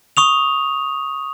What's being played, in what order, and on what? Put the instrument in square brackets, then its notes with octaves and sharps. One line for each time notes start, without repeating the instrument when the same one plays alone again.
[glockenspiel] C#6 D#6 F7